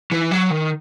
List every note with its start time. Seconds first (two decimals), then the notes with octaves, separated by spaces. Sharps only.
0.11 E3
0.31 F#3
0.50 D#3